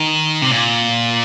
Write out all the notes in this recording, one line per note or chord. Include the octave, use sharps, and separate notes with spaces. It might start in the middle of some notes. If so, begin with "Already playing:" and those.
Already playing: D#3
C3
A#2